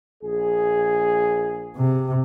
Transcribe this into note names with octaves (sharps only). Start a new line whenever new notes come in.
A#1 G#4
C3